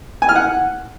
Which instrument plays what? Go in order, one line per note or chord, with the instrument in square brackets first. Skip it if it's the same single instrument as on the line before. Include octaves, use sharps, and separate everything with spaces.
[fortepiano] G#5
F6
F#5